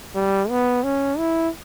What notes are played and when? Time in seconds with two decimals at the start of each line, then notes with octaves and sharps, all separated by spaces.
0.15 G3
0.49 B3
0.84 C#4
1.18 E4